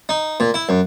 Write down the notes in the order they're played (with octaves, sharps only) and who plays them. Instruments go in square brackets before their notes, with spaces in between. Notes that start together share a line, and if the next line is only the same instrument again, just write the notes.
[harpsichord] D#4
A#2
E4
F#2